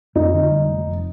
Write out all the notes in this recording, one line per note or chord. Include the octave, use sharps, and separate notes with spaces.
F2 D#4
D3
G3
F1
F2